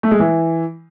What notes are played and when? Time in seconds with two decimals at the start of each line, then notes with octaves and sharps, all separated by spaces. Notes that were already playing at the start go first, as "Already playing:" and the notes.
0.03 A3
0.11 G#3
0.20 E3